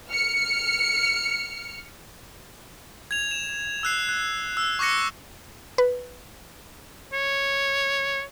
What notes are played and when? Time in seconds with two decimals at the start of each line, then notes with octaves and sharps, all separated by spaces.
0.11 F6 C#7
3.11 G#6 F7
3.31 E7
3.83 E6 F#6 C7
4.09 F#6
4.57 E6
4.79 C#6 D6 F#6 A#6 C#7
5.78 B4
7.13 C#5